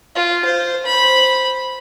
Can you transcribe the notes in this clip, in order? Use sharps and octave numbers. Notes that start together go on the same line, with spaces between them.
F4
C5
C5 B5